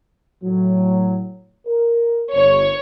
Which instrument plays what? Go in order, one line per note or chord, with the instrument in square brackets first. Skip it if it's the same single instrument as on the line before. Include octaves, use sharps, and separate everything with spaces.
[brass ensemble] A2 F#3
A#4
[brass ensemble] G1 [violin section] C#5